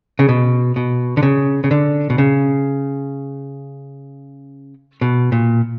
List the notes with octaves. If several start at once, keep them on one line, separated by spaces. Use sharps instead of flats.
C#3
B2
B2
D3
C#3
C#3
D3
B2
C#3
B2
A#2